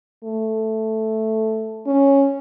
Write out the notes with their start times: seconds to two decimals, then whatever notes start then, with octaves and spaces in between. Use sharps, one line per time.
0.25 A3
1.87 C#4